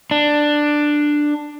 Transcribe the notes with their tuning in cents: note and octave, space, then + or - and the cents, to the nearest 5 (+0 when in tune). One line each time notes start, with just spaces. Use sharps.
D4 +10